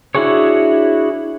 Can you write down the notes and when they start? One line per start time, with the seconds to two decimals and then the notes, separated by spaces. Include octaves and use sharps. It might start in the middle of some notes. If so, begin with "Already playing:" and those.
0.15 D4 E4 F#4 G#4 C#5